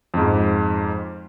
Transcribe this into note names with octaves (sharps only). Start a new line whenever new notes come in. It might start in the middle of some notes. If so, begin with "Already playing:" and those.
F2 G#2